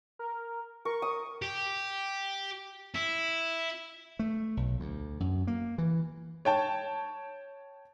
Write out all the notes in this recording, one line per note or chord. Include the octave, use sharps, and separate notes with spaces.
A#4
A#4 C#6
D#6
G4
E4
A3
B1
D2
F#2
A#3
E3
C#5 G5 A5